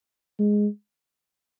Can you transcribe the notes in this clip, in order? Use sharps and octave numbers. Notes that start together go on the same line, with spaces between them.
G#3